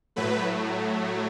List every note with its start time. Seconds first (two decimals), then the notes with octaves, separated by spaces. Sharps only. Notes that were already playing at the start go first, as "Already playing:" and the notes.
0.16 A2 F#3 A3 B4